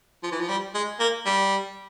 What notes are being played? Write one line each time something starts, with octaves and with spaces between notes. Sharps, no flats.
F3
E3
F3
G3
G#3
A#3
G3